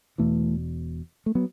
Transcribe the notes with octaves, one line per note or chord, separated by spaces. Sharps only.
E1 E2 B2 E3 A3
A3
F#3 B3